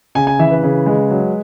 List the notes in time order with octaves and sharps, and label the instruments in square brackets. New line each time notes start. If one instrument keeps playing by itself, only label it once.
[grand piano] C#3 G#5
G#5
E3 E5
B4
C#3
G#3
F#3